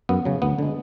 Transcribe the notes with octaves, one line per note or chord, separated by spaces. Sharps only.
F#2 B3
C#3 F#3
D2 B3
D3 G#3